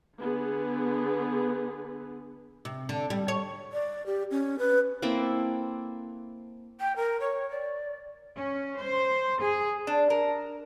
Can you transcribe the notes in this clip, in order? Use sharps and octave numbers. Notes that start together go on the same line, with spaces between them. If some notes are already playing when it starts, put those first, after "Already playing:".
D3 B3 G#4
C3
D3
G3
C#5
D5
G4
C#4
B4
A#3 C4 E4 A4
G5
A#4
C#5
D5
C#4
C5
G#4
D4
A#4